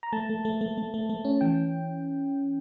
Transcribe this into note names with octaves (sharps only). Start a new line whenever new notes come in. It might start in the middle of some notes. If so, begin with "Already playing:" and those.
A#5
A3 A5
A3
A3
A3
A3
A3
A3
C#4
E3 G5